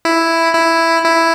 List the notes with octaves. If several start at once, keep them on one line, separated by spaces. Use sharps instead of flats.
E4
E4
E4